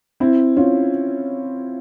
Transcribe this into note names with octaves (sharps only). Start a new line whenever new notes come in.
C4 E4
C#4 F4